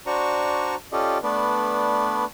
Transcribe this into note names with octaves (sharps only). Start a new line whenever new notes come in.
D4 F#4 C5 D5 A#5 C#6
C#4 F4 G4 A4 D5 D#5
A3 B3 D4 B4 D5